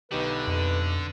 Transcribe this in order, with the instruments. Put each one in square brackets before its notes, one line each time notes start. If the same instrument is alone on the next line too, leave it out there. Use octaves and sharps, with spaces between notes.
[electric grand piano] B1 D#4 G4 [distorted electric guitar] D3 [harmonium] B4
[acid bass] F2